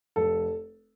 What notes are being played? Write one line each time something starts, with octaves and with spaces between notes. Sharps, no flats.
F1 A4